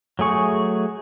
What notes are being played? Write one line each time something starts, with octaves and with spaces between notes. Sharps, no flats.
F#3 A3 G#4 C#6